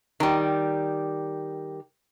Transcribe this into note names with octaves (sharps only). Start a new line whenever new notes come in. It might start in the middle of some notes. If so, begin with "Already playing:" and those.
D#3 G3